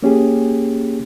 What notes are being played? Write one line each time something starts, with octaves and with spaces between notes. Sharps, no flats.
A#3 C#4 G4 G#4